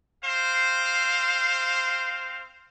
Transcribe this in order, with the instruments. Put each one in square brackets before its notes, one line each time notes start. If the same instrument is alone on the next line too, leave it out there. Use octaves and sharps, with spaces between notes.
[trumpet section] C4 C5 F5